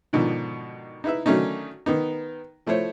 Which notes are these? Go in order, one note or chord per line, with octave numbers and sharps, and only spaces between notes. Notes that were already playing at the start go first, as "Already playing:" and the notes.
G#2 B2 D3 D#3 F3
D#4 E4 B4 E5
D3 D#3 F#3 A3 C#4 D#4
D#3 B3 D#4
F3 A3 E4 C5 C#5